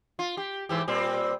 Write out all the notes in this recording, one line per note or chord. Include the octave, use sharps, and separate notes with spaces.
F4
G4
G#2 E3 G4
A#2 G3 C4